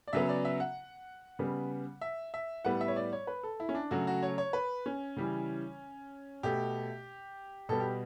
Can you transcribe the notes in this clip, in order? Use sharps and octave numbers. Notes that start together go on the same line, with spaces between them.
D5
C#3 F#3 B3 E5
D5
E5
F#5
C#3 G3 B3
E5
E5
A2 G3 B3 F#5
E5
C#5
D5
C#5
B4
A4
E4
C#4
D4
C#3 F#3 A3 F#4
F#4
C#5
C#5
B4
C#4
C#3 E3 G3
B2 A3 G4
B2 G3 B3 A4
G4